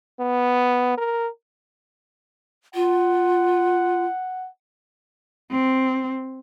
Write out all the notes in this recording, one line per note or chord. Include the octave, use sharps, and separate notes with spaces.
B3
A#4
F4 F#5
C4